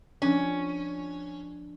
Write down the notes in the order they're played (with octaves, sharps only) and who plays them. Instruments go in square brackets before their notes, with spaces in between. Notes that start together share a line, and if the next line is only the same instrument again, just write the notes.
[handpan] F3 D4 [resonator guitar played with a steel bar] C#4